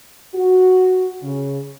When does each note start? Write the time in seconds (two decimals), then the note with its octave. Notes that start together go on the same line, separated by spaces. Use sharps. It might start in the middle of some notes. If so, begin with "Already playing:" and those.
0.34 F#4
1.22 C#3